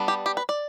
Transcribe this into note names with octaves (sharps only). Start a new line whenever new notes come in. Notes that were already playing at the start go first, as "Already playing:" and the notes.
Already playing: G3 B3 D4
G4
G4
B4
D5